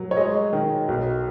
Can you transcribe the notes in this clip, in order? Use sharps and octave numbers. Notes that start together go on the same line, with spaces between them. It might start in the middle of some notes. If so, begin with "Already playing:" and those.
Already playing: F#3
C#5
G#3 D#5
D#3
B1